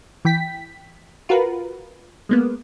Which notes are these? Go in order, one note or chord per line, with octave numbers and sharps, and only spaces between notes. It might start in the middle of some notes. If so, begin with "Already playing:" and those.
E3 G5 B6
F4 F#4 A#4 B4
G#3 A#3 B3